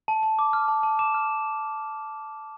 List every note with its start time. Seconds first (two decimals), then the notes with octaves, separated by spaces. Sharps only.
0.08 A5
0.23 A5
0.39 D6
0.53 F6
0.68 A5
0.83 A5
0.99 D6 E7
1.14 F6